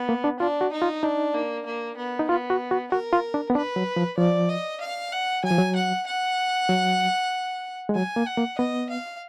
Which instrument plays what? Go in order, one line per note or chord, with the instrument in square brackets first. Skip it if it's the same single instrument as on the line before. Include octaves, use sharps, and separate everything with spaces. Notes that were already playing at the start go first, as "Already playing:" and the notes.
Already playing: [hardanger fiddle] B3
[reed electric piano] A#3
D4
[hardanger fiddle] D4 [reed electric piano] F4
[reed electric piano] F#4
[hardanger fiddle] D#4
[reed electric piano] F4
[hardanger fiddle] D4 [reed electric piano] D#4
[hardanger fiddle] A#3
A#3
B3
[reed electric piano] D#4
[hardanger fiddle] B3 [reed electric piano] F4
[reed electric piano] F#4
F#4
[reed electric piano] F#4 [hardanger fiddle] A#4
[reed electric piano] F4
D4
B3
[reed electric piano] D4 [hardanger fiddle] B4
[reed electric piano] F#3
F3
[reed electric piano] F3 [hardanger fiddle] D5
[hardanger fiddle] D#5
F5
F#5
[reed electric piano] F#3 [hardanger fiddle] G#5
[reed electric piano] F3
F#3
[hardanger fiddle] F#5
F#5
[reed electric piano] F#3
G#3
[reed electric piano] F#3 [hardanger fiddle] G#5
[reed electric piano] A#3
[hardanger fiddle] F#5
[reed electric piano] A#3
[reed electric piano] B3 [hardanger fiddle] D#5
[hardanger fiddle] F5